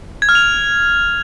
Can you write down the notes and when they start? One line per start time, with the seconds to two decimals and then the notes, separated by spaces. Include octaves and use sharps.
0.22 G#6
0.29 F6
0.35 F7